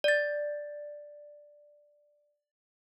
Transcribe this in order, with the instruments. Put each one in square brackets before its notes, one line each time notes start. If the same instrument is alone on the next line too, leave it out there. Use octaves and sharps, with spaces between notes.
[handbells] D5 A6